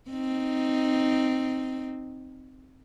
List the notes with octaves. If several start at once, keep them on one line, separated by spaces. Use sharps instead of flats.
C4 D#4